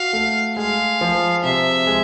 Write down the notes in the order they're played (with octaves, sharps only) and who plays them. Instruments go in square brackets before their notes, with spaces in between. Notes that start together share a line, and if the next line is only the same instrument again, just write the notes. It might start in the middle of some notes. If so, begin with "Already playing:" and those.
Already playing: [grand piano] F#4 [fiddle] F5
[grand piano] A3
[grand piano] G#3 [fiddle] F5
[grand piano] F3
[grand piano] C3 [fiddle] E5
[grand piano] G#3